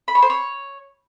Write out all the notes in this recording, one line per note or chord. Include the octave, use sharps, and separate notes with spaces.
B5
C#5
C5
C#5